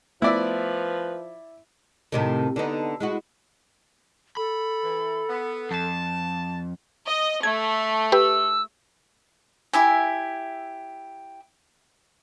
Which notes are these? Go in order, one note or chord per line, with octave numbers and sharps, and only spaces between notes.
F3 A3 B3 E4 B4 D5 E5
A2 C3 D#3
D3 B3 D#4
G#3 E4 F#4
A4 B5
E3
B3
F2 A5
D#5
A3 G#6
G4 B4 E6
E4 G4 E5 G#5